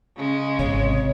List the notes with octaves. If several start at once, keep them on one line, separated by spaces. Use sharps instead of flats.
C#3 G#3
G#1 C3 C#5